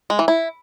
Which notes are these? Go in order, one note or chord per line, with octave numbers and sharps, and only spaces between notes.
G#3
E3
E4